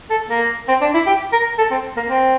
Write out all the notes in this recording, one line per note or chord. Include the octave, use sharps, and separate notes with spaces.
A4
A#3
C4
D4
E4
G4
A#4
A4
C4
A#3
C4